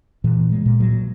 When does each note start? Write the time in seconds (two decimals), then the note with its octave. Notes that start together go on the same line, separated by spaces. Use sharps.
0.24 A#2 E3
0.52 G#3
0.66 A#2
0.80 F#3